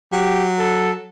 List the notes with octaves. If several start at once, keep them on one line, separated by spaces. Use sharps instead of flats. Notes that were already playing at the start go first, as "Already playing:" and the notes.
F#3 G4
A4